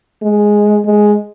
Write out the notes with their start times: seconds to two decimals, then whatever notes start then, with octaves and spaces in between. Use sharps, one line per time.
0.22 G#3
0.85 G#3